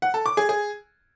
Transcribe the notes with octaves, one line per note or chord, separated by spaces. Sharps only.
F#5
A4
D6
G#4
G#4